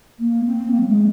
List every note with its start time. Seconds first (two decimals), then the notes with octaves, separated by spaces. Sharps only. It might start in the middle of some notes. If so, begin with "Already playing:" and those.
0.19 A#3
0.45 C4
0.71 A#3
0.80 F#3
0.88 G#3